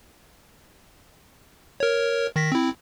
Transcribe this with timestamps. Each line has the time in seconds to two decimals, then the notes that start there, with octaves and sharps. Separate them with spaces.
1.80 A#4 C#5
2.36 D#3 A#6 B6
2.52 C4 E4